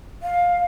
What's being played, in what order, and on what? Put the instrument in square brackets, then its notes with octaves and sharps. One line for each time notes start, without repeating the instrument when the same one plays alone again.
[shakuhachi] F5